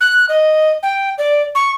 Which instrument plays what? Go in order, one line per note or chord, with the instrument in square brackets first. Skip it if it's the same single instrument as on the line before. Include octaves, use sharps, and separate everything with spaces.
[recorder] F#6
D#5
G5
D5
C#6